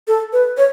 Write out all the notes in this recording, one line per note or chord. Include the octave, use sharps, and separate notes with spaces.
A4
B4
C#5